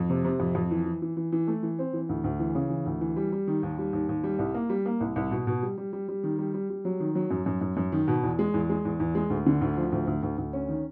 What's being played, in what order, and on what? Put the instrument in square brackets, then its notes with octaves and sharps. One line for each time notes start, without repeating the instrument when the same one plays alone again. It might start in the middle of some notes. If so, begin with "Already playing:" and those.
Already playing: [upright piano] F2
C3
C3
F2
F2
E3
E3
E3
E3
E3
A3
E3
C4
E3
D2
D2
E3
C#3
E3
D2
E3
G3
G3
D#3
D#2
G3
D#2
D#2
G3
C2
A#3
G3
A#3
C2
C2
B2
B2
G3
G3
G3
G3
D#3
G3
G3
G3
F#3
D#3
F#3
F#2
F#2
F#2
F#2
D#3
B2
E2
G#3
E2
G#3
E2
E2
G#3
D2
D3
D2
F3
D2
D2
D2
D2
C#4
D#3